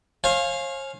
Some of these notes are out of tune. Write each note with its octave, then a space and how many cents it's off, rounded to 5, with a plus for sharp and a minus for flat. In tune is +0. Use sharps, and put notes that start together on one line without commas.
C#5 -45 F5 -5 G#5 +20